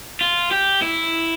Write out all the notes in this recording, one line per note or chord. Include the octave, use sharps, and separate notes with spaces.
F4
G4
E4